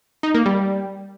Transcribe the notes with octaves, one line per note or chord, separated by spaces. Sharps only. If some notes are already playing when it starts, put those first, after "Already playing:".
D#4
A#3
G3